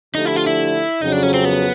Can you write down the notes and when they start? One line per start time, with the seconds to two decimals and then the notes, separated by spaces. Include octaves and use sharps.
0.15 D3 F3 A3 D4 D#4 G4
0.25 E4
0.36 F4
0.47 E4
1.01 F2 C#3 F#3 D#4
1.12 D4
1.23 C#4
1.34 C4
1.45 B3